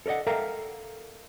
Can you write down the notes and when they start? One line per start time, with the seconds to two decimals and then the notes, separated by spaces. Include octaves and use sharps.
0.06 A4 A#4 D5 D#5 F#5
0.27 A4 A#4 E5 F5 G5 A#5